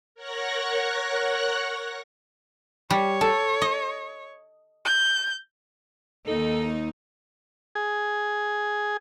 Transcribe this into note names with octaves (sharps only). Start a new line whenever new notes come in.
A#4 C#5 F#5 C#6 F#6 A#6
G3 C#5
A4
D#5
G6
D#2 D#4 A4
G#4